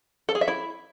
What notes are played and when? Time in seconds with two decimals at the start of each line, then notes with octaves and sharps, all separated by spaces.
0.29 A4
0.35 G#4
0.41 E5
0.48 E4